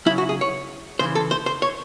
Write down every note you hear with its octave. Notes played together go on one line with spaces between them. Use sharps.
C#3 F#3 E4
F#4
G#4
C#5
C#3 E3 C5
A4
C5
C5
C#5